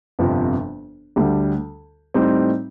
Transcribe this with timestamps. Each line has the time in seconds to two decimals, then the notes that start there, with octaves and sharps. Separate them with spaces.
0.19 G1 F2 C3 F3
1.16 D2 D3 G3
2.14 A2 G3 C4 D#4